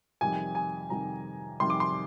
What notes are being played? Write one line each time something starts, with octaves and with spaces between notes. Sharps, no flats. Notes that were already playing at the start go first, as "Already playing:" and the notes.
F2 C3 D#3 G3 G#5
G#5
F2 C3 D#3 G3 A#5
F2 C3 D#3 G3 C6
D6
C6